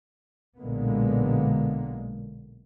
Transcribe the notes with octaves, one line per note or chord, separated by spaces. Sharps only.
B1 A#2 D3 G#3 A#3 B3